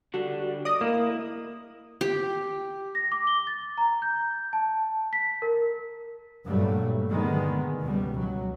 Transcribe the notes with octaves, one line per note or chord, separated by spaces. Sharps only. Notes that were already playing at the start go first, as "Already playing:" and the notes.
D3 G3 D4 F#4
D5 D#5 D#6
A#3 E4
G4
A#6
D6
G7
A6
A#5
G6
A5
B6
A#4
G2 A#2 F#3 G3 A3
D3 D#3 G#3 B3
C#2 B2 G3
F#3